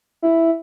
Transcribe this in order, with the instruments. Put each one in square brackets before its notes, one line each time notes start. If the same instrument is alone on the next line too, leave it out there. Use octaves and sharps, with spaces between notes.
[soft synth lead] E4